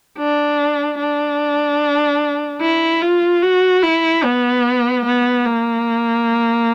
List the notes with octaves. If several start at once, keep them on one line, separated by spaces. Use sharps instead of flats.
D4
D4
E4
F4
F#4
E4
B3
B3
A#3